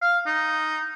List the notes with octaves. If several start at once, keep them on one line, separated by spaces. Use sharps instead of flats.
F5
D#4